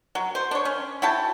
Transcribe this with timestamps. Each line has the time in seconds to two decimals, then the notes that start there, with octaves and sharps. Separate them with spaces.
0.15 F#3
0.35 C5
0.51 D4 C#5
0.65 C#4
1.02 E4 F#4 G5 A5